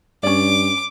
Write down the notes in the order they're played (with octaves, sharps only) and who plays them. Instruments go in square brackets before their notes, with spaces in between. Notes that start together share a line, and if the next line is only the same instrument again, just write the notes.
[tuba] G2 [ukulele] C#4 D5 [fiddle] D6